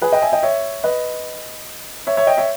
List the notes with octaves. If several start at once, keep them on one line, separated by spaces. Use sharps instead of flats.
G#4 B4
D#5 G5
E5 G#5
D#5 G5
C#5 E5
B4 D#5
C#5 E5
C#5 E5
D#5 G5
C#5 E5